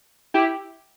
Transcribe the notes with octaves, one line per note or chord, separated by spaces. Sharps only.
E4 G4